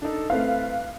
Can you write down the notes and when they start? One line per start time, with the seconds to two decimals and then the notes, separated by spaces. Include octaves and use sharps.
0.02 D4 D#4 A4
0.30 A3 C4 E4 B4 F5